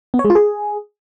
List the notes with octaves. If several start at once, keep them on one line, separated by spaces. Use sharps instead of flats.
B3
C#5
G#3
F4
G#4